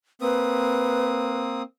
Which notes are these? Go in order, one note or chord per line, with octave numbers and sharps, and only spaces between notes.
A#3 C4 B4 D#6